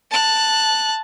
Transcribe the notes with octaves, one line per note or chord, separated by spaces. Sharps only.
A5 F#6